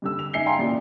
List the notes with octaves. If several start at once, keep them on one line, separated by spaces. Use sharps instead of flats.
G2 D3 E6
F7
G#2 E5 G#5 C7 C#7 G7
F5 G5 G#5 A#5 C6
A1 A#2 D5